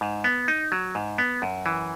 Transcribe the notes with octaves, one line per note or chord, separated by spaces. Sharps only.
G#2
B3
D#4
F#3
G#2
B3
F#2
E3